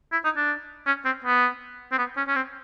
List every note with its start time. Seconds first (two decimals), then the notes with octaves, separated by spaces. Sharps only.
0.12 E4
0.24 D#4
0.37 D4
0.86 C#4
1.05 C4
1.24 B3
1.92 C4
1.98 B3
2.17 C#4
2.27 C#4
2.35 C4